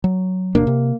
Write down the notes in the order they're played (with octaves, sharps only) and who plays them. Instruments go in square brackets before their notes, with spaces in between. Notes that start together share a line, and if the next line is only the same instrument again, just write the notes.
[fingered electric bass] F#3
[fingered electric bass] D#1 B2 D4 [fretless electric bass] A#3
[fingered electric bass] C3